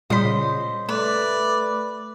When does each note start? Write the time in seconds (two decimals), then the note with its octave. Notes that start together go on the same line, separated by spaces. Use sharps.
0.10 A#2 C#3 G3 C5 D#5 B6
0.89 A3 B4 D5